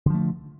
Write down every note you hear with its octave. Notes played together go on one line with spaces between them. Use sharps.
D3 F3 A3